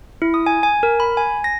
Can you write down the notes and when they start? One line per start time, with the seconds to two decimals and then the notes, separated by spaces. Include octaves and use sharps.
0.22 E4
0.34 D#6
0.46 G#5
0.63 G#5
0.83 A#4
1.00 B5
1.17 G#5
1.44 A#6